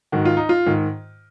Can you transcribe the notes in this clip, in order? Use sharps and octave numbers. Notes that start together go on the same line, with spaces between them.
G#2 D#3 F#4
F4
D#4
F4
G#2 D#3